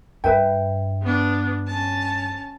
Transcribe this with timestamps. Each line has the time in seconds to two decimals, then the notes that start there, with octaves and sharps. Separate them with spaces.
0.24 G2 B4 E5 G5
1.02 B3 D4
1.67 C#4 A5